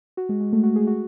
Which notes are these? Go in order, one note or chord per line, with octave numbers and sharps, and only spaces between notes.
F#4
G#3
G#3
A3
F#4
G#4
F#4